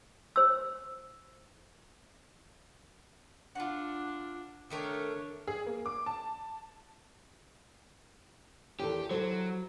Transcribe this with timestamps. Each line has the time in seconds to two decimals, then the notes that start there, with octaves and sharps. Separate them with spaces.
0.36 C5 E6
3.55 D4 F4 F#5
4.70 D#3 A3 D4 A#4 C#5
5.47 G#4
5.66 A#3
5.86 D6
6.06 A5
8.80 E2 D#3 G4 A4
9.11 F#3 E4 A4 C5